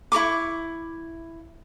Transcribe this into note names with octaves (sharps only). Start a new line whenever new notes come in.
E4 A#4 C#6 D6